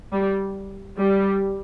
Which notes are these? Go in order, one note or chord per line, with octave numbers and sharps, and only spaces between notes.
G3
G3